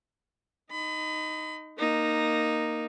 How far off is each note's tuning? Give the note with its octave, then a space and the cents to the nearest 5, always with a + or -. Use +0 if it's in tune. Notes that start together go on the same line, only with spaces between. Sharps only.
D#4 +0 B5 +35
A#3 +0 D#4 -10